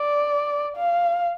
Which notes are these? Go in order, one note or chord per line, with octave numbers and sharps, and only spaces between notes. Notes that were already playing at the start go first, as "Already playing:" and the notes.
Already playing: D5
F5